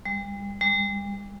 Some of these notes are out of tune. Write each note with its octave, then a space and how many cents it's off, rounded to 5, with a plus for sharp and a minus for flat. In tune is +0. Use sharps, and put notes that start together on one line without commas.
G3 +40
G3 +45